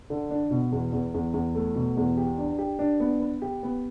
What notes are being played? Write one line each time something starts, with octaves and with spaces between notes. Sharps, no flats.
D3
D4
B2
E2
E2
E2
E2
A3
B2
E2
G4
D4
G4
D4
B3
B3
G4
B3